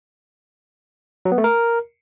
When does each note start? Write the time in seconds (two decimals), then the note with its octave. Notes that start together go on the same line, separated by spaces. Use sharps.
1.25 F#3
1.32 B3
1.38 A3
1.44 A#4